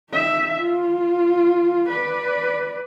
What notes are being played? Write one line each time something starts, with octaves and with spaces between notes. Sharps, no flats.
D#4 E5
F4
B4 D5